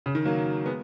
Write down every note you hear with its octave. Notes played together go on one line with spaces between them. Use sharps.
C#3
D#3
F#3 A#3
G#3 B3